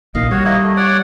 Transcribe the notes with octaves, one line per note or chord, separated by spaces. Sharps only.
A#1 A#2 D#3 D#5 F5
G3 F#4 C#5
A#3 E4 D#5
A3
C#5 D5 F#5